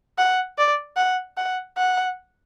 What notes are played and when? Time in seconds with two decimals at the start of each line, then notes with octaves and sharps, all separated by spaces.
0.18 F#5
0.58 D5
0.97 F#5
1.38 F#5
1.77 F#5